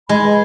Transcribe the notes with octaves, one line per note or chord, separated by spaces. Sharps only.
G#3 B5
B4